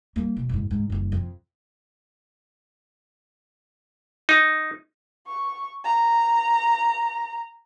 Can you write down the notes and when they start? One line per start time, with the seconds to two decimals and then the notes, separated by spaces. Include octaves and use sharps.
0.16 G3 A#3
0.36 B1
0.49 F#1 G#2
0.71 G#2
0.90 F#1 G2
1.12 F2
4.29 D#4
5.27 C#6
5.84 A#5